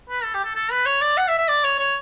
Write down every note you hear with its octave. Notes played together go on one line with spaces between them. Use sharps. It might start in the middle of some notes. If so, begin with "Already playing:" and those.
B4
A4
G4
A4
A4
B4
C#5
D5
F#5
E5
E5
D5
C#5
C#5